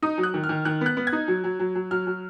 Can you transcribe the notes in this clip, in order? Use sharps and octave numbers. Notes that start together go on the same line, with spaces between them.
D#4 D#6
F#3
F#6
D#3
F6
D#3
D#3 F#6
B3 F#6
B3
G#6
D#4
F#3
F#3
F#3
F#3
F#3 F6
F#3